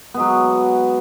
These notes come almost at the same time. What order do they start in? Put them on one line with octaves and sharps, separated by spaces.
B3 G#3 F#3